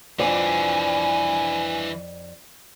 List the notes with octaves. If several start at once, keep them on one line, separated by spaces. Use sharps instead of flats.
F2 E3 D4 D5 G#5